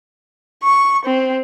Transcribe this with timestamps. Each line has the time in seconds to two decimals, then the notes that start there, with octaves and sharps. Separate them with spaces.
0.63 C#6
1.05 C4